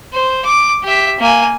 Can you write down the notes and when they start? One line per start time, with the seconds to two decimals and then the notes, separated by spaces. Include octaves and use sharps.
0.13 C5
0.45 D6
0.83 G4 E5
1.19 A#3 G#5